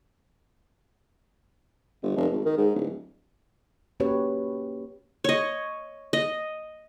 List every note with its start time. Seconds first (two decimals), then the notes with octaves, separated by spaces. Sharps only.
2.03 G1
2.16 F1
2.32 G#1
2.45 D#3
2.57 G#2
2.75 D1
4.00 A#3 C#4 F#4 G4 B4 C#5
5.24 C#5 D#5
6.13 D#5